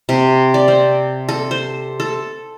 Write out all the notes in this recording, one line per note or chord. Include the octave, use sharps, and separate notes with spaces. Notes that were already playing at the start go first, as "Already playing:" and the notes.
C3
D5
C4
A4
C5
A4